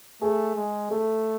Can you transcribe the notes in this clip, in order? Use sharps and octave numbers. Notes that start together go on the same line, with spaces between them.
A3 G#4
G#3
A3 A4